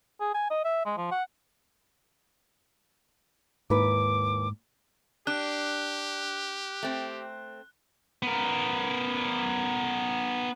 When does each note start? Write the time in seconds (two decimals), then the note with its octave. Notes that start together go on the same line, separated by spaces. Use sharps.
0.21 G#4
0.35 G#5
0.51 D#5
0.65 E5
0.86 G#3
0.98 F3
1.11 F#5
3.70 D#2 G#2 E4 B4 D6
5.27 D4 G4 F#6
6.83 A3 C4
8.22 B3 A#4